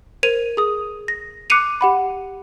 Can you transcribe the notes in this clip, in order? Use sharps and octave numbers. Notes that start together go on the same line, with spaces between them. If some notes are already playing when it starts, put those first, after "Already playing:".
A#4 C5 G#6 D#7 F7
G#4 D#6
A#6
D6 F#6 C7 C#7 D#7 F7
G4 F#5 B5